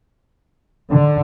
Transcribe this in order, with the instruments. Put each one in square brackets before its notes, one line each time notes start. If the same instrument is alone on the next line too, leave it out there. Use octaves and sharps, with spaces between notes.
[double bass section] D3